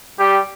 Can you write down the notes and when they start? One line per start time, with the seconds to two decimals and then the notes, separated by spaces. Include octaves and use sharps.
0.18 G3 G4